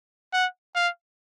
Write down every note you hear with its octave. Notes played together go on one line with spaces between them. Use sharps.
F#5
F5